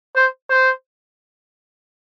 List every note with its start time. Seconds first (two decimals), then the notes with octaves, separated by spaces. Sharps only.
0.16 C5
0.50 C5